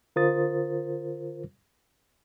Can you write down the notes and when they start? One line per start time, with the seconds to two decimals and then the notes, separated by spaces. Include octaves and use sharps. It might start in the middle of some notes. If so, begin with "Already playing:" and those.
0.16 D3 F4 A#4 C5 D#6 A6